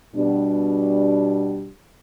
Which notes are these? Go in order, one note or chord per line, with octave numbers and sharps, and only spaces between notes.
B2 G3 D4